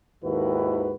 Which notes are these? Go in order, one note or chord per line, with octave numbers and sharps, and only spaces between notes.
D#2 G#2 D#3 E4 F#4 B4